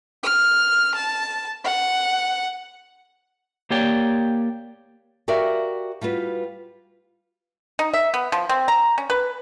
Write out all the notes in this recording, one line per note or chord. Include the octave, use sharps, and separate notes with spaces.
F6
A5
F#5
A#3 G4 C#5 D5 G5
F#4 G4 A#4 D5 E5 F5
G3 F4 F#4 B4
D#4
E5
B3
F3
C4
A#5
C#4
B4